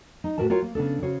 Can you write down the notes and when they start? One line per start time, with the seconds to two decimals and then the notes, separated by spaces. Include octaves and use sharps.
0.24 D#4
0.38 A2 C#4 F#4 A#4 B4 A5
0.50 F4 F#4 A#4 C#5 G5
0.62 A#3
0.75 C#3 B3 D4 A4
1.02 C#3 F#4 C5 C#5